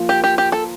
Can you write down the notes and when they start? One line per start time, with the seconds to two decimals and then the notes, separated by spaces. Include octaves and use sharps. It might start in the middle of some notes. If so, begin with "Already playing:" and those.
Already playing: F3 A#3 F4 A#4
0.09 G4
0.24 G4
0.38 G4
0.52 A4